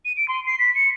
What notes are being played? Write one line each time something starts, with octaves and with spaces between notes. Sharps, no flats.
D#7
D7
C6
C7
B6
C#7